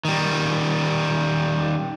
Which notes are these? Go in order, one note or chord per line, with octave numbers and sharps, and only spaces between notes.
D#3 G3